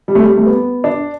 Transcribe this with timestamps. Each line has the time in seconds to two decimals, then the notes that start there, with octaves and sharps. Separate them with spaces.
0.08 G3
0.15 A3
0.23 G3
0.38 A3
0.46 B3
0.84 D4